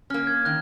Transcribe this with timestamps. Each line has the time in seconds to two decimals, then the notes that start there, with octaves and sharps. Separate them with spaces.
0.10 A#3 C#4 F6
0.27 G#6
0.45 D#3 F#6